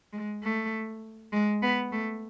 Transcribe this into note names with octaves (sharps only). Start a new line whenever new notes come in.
G#3
A3
G#3
B3
A3